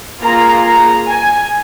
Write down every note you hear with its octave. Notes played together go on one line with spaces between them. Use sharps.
A#3 F4 G#4 A#5
A#5
G#5